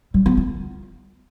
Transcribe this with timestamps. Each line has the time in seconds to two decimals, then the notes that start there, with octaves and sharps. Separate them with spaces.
0.14 G3
0.26 B3
0.37 F4